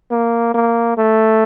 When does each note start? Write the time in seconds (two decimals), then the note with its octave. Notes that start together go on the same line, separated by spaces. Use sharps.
0.11 A#3
0.54 A#3
0.97 A3